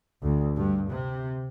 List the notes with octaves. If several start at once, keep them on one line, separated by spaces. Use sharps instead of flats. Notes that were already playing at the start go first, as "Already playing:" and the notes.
D2
G2
C3